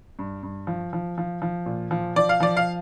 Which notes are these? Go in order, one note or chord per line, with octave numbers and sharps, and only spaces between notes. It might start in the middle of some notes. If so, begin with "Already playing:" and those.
G2
G2
F3
F3
F3
F3
A#2
F3
F3 D5
F5
F3 D5
F5